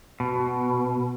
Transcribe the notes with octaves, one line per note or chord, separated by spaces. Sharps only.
B2